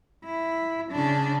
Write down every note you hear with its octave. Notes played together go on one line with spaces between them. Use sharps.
E4
C#3 D4